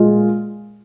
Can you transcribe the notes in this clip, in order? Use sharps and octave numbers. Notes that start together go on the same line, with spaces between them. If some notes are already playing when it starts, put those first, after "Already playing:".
Already playing: A#2 G#3 F4